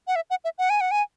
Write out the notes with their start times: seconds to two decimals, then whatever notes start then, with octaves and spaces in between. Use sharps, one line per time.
0.07 F#5
0.16 E5
0.30 F#5
0.44 E5
0.58 F#5
0.70 G#5
0.81 F#5
0.91 G#5